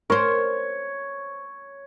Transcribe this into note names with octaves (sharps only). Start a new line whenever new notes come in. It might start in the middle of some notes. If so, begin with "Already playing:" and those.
A#4 C5 C#5